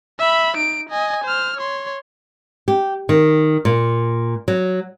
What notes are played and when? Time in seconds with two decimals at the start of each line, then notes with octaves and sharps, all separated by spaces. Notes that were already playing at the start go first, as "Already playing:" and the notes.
0.19 E5 B5
0.57 D#4 D7
0.89 D#5 G#5
1.24 C5 F6
1.57 C#5 C6
2.68 G4
3.09 D#3
3.65 A#2
4.48 F#3